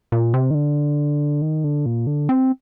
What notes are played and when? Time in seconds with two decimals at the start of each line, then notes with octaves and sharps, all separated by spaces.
0.12 A#2
0.34 C3
0.51 D#3
0.55 D3
1.42 D#3
1.64 D3
1.86 A#2
2.07 D3
2.29 C4